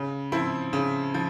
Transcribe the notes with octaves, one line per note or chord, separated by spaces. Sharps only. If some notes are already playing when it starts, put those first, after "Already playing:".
Already playing: C#3
F3 C4 E4
C#3
F3